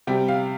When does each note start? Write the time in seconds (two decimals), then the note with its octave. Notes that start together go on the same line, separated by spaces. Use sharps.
0.07 C3 G3 G5
0.28 F5